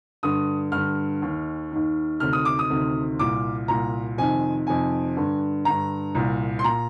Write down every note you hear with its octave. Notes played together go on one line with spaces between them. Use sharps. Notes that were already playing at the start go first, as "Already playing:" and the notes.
G2 D3 D#6
G2 D3 F6
D#2 D#3
D#2 D#3
D2 C3 D#3 F6
D#6
D6
D#6
D2 C3 D#3
C2 A#2 D6
C2 A#2 A#5
F2 C3 D#3 G#5
F2 C3 D#3 G#5
G2 D3
G2 D3 A#5
C2 A#2
C6
A#2 A#5